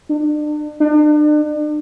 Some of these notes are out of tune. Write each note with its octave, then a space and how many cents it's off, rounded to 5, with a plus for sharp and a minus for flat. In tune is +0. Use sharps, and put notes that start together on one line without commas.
D4 +35
D4 +40